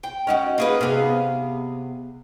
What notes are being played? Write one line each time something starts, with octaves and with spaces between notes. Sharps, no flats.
G5
C#4 D#4 F#4
A#3 G#4 B4
C3 B3 G#4 F5